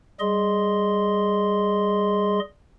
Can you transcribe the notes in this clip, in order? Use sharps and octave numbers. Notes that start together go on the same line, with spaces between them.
G3 G#4 D#5 C6